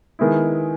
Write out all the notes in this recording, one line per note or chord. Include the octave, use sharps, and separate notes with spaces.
D#3 G#3 B3 E4